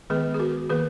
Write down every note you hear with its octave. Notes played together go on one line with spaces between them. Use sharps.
D#3 G#3 B3 G#4 B4
G#4
F#4 A#4
D#3 A#3 G#4 B4